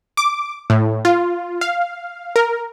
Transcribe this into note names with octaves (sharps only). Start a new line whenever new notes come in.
D6
A2
F4
F5
A#4